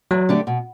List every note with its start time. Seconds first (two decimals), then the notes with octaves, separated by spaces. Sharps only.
0.11 E2 F#3
0.29 D3 A3 D4 G4
0.47 B2